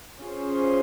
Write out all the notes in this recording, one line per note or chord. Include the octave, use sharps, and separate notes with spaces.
C#4 F4 G#4 C5